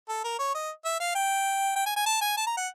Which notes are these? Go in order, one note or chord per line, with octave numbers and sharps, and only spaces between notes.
A4
A#4
C#5
D#5
E5
F5
G5
G5
G#5
G#5
A5
G#5
A5
A#5
F#5